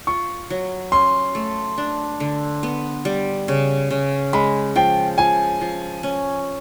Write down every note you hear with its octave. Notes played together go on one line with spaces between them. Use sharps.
F4 C#6
F#3
C#4 C6
A3
D4
D3
B3
G3
C#3
C#3
G#3 B5
F3 G5
F3 G#5
F3
C#4